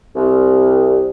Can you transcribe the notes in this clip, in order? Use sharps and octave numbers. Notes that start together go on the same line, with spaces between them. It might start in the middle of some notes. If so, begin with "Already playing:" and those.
C2